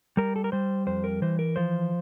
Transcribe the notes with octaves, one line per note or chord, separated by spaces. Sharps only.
G3 A#4
A4
A#4
G3 C5
F2 C5
A#4
E3 C5
A#4
F3 C5